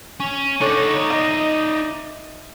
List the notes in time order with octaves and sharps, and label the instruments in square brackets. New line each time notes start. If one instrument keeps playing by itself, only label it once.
[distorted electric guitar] C#4
[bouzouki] D3 C#5 [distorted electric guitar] D#4 D5
[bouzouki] D#5 E5